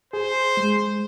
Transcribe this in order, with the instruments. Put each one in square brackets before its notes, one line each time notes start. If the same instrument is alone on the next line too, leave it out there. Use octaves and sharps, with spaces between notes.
[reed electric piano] G#4 [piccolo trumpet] C5
[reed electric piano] G#3